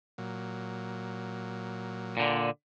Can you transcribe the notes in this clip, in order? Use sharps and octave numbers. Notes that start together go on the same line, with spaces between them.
A#2 F#3
A#2 D3